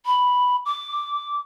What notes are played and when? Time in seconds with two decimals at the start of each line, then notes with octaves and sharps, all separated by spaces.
0.06 B5
0.66 D6